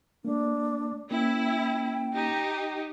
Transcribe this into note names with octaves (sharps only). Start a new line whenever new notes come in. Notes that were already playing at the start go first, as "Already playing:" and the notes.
A3 A#3 D4
A#3 C#4 E4 G5
D#4 G4